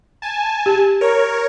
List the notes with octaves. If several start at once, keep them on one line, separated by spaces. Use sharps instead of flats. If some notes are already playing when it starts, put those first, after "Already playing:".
G#5 A5
G4
A#4 C#5